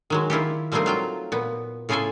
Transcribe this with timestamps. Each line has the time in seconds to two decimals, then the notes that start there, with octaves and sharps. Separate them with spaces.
0.10 D#3 F#3 G#3
0.30 D#3 E4 F4 G4
0.72 F3 G3 A3 A#3 C4 D#4
0.86 F#3 F4 G5
1.32 A#2 B3
1.89 A2 C#3 F4 G#4 A4 G#5